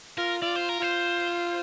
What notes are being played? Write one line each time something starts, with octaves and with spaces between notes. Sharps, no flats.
F4 A#4
F4 D5
C5
A#4
F4 C5